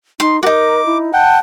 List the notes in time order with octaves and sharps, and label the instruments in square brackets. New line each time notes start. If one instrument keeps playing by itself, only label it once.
[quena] D#4 [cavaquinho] C6
[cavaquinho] D#4 F#4 [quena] A#4 [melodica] D6
[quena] E4
[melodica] F#5 G5 [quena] A5